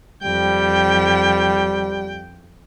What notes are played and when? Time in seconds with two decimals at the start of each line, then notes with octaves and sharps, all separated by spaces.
0.23 F2 G3 G5